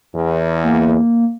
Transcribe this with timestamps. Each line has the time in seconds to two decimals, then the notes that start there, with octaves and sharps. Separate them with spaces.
0.15 E2
0.64 A#3